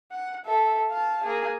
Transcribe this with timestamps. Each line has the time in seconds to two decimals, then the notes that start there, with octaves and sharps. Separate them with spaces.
0.12 F#5
0.45 A4 E5
0.91 F5 A5
1.23 A#3 G#4